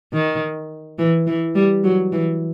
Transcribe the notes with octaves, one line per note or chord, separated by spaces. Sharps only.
D#3
E3
E3
G3
F#3
E3